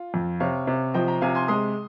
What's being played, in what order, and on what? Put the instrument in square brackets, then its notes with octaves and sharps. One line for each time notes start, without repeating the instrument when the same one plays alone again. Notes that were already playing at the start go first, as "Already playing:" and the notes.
Already playing: [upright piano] F4
[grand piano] F2
[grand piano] C3 [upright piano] C#5 F5
[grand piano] C3
[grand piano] F3 [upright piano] D#5 G5
[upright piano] G5 A#5
[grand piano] C3 [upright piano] F5 G#5
[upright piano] G#5 C6
[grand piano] G#3 [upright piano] C6 D#6